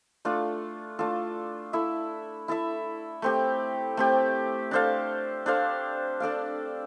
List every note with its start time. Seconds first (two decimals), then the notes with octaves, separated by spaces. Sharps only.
0.25 A3 D4 F4 A4
0.99 A3 D4 F4 A4
1.73 E4 A4 E5
2.48 E4 A4 E5
3.22 A3 C4 G4
3.97 A3 C4 G4
4.71 D4 A4 C5 F5
5.46 D4 A4 C5 F5
6.20 D4 A4 D5 F5